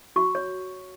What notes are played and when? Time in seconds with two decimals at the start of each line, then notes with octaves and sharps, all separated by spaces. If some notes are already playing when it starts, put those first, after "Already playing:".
0.16 F#4 C#6
0.35 C#5